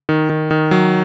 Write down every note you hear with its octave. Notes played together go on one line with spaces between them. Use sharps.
D#3
D#3
D#3
F#3